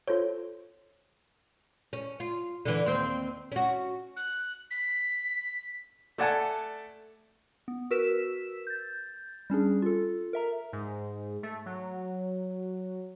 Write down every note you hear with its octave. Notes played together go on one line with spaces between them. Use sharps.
F4 A4 C5 C#5
C#4
F4
D3 E3
D#2 C4 C5
C#4 F#4
F#6
B6
A3 A4 D5 F#5 G#5 A5
B3
F#4 A#4 B4 E6 B6 E7
G6 A6
G3 C#4 D4 G#4
F4 A4
A#4 E5 A#5
G#2
A3
F#3